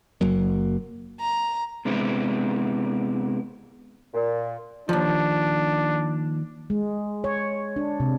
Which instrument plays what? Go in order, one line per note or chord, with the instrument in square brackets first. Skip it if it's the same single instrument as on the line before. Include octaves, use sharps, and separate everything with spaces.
[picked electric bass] F#1 F#2 F#3 A#3
[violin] A#5
[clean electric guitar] C3 G#3 B3 D4 E4
[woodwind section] A#2
[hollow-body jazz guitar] D#2 F3 [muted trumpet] D4
[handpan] G#3
C#5
D4
C3